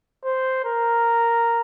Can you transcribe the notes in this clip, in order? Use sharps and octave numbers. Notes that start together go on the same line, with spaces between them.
C5
A#4